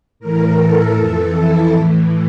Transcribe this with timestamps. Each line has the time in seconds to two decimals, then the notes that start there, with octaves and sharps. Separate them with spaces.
0.20 A2 E3 A#4
0.58 A4
0.96 F2 E3 A4
1.35 E4
1.73 A2 E3